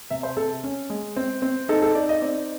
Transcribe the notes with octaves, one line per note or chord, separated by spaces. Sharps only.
C3 E5
C5
C3 A4
C#4
G#3
C4
C4
D#4 A4
A4
D#4 D5
D#5
C4 D5